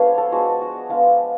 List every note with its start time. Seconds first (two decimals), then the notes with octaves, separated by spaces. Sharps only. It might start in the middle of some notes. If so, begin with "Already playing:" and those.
Already playing: F3 G#3 B3 D4 C#5 F5
0.18 A4
0.32 F3 G#3 B3 D4 F#4
0.61 F#4
0.89 F3 G#3 B3 D4 F5